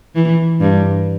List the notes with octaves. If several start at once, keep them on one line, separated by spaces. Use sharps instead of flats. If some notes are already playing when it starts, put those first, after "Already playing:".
E3
G2